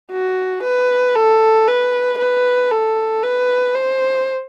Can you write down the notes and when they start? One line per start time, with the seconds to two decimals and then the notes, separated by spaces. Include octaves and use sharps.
0.11 F#4
0.63 B4
1.15 A4
1.68 B4
2.19 B4
2.71 A4
3.23 B4
3.75 C5